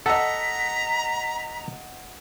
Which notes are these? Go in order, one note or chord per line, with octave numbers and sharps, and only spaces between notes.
A4 D#5 F#5 A#5 B6